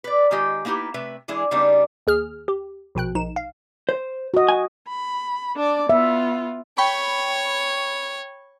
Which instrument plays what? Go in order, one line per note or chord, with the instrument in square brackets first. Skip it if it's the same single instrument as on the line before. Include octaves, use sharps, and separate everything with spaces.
[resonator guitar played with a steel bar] B4 D5
D#3 G#3 F4 G4 D#5
A#3 B3 D#4 E4 G4
C3 A3 B4 E5
E3 G#3 D4 E4 G#4
C#3 G3 B3 D4 D#4
[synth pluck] D#2 G#4 F6
G4
A#1 B2 G5 F#6
A#1 D#4 E7
F5
[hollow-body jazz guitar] C5
[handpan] F#4 D#5
[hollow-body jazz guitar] G#5
[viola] B5
D4 D5
[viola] B3 F4 [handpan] E5
[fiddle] C#5 [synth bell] G5 B5 C#6